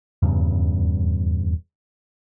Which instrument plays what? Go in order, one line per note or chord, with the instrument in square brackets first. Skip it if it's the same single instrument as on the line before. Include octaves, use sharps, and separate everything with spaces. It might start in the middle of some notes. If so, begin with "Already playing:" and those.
[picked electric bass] D#1 E2 G2 C#3